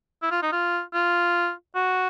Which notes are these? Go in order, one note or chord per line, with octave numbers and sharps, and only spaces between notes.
E4
F4
D#4
F4
F4
F#4